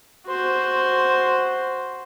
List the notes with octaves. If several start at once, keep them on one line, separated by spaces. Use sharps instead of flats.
F#4 C5